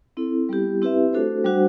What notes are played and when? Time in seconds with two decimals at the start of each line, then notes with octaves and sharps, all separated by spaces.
0.17 C4 E4 A4
0.49 G3 B3 E4 G4
0.82 C4 E4 G4 B4 E5
1.13 A3 D4 F#4 A4 C5
1.44 G3 D4 F#4 C5 F#5